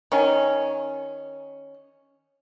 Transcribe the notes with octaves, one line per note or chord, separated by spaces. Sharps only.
D#3 C#4